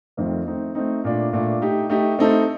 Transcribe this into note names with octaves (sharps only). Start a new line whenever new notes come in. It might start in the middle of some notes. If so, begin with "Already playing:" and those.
F2 D#3 A3 C4
A3 C4 D#4
A3 C4 D#4
A#2 A3 D4
A#2 A3 D4
A3 D#4 G4
A3 D#4 G4
A3 C4 D#4 A4